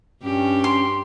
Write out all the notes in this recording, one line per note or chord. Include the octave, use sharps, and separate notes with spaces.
G2 C#4 G4
C6